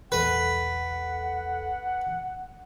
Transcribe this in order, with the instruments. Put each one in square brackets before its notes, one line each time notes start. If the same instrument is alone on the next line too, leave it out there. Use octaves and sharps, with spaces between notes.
[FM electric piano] B1 E2 A4 [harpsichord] B4 [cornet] F#5